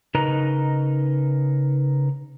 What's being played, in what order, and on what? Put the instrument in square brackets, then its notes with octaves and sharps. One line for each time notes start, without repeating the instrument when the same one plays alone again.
[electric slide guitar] C#3 D#4 A#4 B4 D#5 A#5